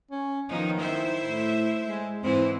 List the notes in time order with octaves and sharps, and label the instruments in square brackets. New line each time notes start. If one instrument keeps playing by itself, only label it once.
[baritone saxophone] C#4
[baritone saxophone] D#3 [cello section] F3 B3 D#4
[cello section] E4 C5 E5
[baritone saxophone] A2
G#3
[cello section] G#2 E3 E4 [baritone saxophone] C4